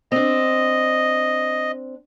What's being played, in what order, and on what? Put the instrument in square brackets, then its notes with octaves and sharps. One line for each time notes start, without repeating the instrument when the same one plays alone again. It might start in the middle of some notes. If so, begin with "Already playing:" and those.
[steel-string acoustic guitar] C4 D4 [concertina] D#5